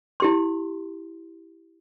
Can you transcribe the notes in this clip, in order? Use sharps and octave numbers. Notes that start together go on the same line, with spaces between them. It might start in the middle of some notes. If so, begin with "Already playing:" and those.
E4 G4 C6